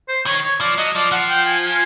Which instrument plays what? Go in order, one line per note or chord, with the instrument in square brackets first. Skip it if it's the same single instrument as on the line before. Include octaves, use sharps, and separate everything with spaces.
[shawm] C5
[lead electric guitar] D#3 [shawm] C#5
[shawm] C#5
[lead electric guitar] F3 [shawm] D5
[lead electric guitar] F#3 [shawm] D#5
[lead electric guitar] F3 [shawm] D5
[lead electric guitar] F3 [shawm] F#5
[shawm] G5
G#5